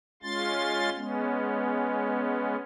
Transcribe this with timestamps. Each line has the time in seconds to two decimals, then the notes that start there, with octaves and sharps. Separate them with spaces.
0.23 G#3 C#4 F4 C6 A6
0.96 G#3 B3 C#4